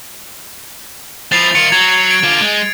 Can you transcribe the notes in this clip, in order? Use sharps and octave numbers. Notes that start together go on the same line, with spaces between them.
F3 E4 A6 C7 F7
D#3 F4 C#7
F#3 G#6
G#6 C#7 D7
D3 F4
G#3